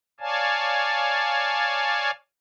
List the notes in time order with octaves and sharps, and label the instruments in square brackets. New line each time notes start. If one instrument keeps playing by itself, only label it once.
[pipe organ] C#5 D5 F5 G#5 A5